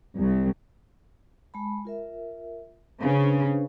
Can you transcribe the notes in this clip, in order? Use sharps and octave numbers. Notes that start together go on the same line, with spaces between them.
C2
G#3 A5 B5
F4 A#4 E5
C#3 D4 B4 C5